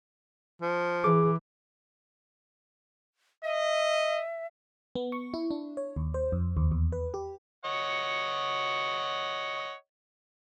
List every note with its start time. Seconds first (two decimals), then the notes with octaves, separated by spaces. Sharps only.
0.61 F3
1.04 E3 G#4 D6
3.44 D#5 E5
4.95 B3
5.12 C#6
5.34 E4
5.51 D4
5.77 C#5
5.96 D#2
6.14 C5
6.32 F2
6.57 D#2
6.72 E2
6.92 B4
7.14 G4
7.65 C#5 D#5 F#5